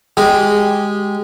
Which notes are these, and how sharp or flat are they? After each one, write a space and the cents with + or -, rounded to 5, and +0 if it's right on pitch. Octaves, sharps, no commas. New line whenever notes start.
G#3 -10 G4 -15